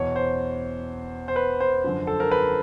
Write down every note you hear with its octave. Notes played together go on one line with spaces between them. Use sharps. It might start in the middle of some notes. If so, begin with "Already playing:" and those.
Already playing: E2 B2 C#5
C5
C5
B4
C5
F#2 D3 F3
A4
A#4
B4